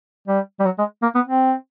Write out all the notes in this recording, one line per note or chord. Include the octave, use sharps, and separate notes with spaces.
G3
G3
F#3
G#3
A#3
B3
C4